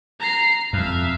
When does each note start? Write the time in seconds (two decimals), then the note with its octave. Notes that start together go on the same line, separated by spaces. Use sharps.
0.20 A#5 C7
0.73 F2 E5 F5